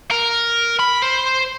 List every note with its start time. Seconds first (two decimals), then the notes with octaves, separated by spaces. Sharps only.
0.11 A#4
0.80 B5
1.02 C5